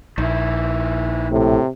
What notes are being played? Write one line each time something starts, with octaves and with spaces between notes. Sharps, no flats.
A#1 D#3 E4
A2 C3